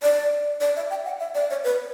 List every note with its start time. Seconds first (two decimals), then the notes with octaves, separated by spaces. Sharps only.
0.02 D5
0.61 D5
0.76 E5
0.90 G5
1.05 F#5
1.20 E5
1.35 D5
1.50 C#5
1.64 B4